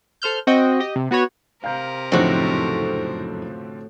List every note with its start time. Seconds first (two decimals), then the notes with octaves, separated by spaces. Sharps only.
0.22 A4 C5 F6 G6
0.47 C4 F#4 D#5 G5
0.80 G4 D#5
0.96 C3
1.11 B3 F#4 B4 C#5
1.64 C3 A#4 F5 A#5 G6
2.12 F#1 F2 A2 D3 F3 C4 D#4 F#4